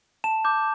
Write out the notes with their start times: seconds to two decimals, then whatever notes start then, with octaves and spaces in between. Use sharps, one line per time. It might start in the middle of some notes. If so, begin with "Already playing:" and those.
0.24 A5 E7
0.45 D6 G6